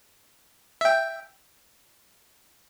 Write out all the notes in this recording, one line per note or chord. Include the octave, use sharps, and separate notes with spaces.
E5 G5